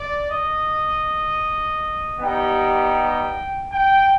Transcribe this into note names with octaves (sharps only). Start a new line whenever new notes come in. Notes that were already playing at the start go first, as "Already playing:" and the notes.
Already playing: D5
D#5
G3 B3 D#4 G4 G5
G5